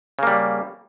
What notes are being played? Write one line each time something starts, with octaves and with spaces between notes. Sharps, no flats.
C#3 G3 A#3